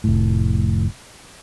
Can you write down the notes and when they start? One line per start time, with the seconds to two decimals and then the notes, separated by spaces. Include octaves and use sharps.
0.04 F1 A2